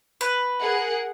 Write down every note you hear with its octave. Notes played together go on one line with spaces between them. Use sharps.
B4
G#4 A#4 F#5